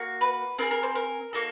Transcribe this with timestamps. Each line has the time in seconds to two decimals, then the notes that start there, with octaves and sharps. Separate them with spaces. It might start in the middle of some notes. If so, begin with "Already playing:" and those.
Already playing: A#3 F#4
0.21 B4
0.58 C4 F4 G#4 A#4
0.71 A#4
0.83 C5
0.95 A#4
1.33 A#3 D#4 F#4 A4